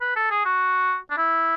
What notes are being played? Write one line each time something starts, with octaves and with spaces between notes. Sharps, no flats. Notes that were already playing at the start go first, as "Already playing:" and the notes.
B4
A4
G#4
F#4
D4
E4